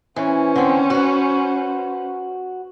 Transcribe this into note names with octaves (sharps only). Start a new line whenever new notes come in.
E3 C#4 C5
D3 C4
F#4 B4